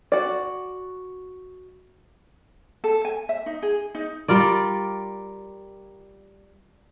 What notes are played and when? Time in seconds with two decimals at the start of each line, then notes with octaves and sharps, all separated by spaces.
0.12 F#4 D5
2.84 A4
3.05 G#5
3.29 E5
3.46 D#4
3.62 G#4
3.95 D#4
4.28 G3 F4 A#4 D5